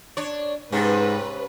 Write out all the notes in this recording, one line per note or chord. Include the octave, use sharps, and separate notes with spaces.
D4 C#5
G#2 C3 C#4 B4